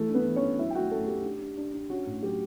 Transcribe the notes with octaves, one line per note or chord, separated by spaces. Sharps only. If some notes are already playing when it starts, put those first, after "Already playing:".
Already playing: E3 A3 A4
D4
B3 B4
E3
C#4 C#5
D4
F#3 E4 E5
G5
A3 F#4 F#5
A3 C#4 A4
A3 G4
D4
D4
D4
D4
C#4 F#4
A2
F#3 G4